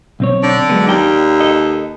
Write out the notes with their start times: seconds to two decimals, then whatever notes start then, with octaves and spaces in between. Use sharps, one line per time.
0.20 B1 C4 C#5
0.43 D3
0.69 F#3 G#3 B3
0.88 D#2 D5 G5
1.40 A4 D#5